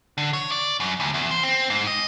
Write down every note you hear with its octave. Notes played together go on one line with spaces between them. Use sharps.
D3
C#5
D5
F#2
D2
E2
C5
C4
G#2
D#5